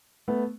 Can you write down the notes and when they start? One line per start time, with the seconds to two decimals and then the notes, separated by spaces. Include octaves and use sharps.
0.28 A3 B3